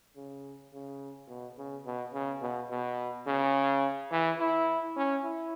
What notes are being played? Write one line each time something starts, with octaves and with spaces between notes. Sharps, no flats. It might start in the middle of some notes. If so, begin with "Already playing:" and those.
C#3
C#3
B2
C#3
B2
C#3
B2
B2
C#3
E3
E4
C#4
E4